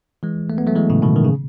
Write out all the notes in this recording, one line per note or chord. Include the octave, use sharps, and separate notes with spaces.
E3 G#3
A3
B3
F#3 A3
E3 G#3
A2 C#3
B2 D#3
D#3
C#3